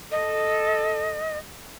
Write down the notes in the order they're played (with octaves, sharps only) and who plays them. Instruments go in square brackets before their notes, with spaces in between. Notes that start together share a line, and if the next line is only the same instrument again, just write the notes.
[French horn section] A4 [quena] D#5